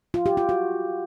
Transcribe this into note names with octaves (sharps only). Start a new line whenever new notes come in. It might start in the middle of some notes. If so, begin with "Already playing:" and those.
F4
G4
F4
F#4